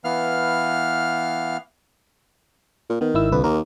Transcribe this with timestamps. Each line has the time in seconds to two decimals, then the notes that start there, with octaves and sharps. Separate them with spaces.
0.04 E3 B3 F5 F6
2.90 A#2
3.01 D#3 B3
3.14 G#1 E4 E6
3.32 C2 F2 D3 B4
3.44 D#2 A#4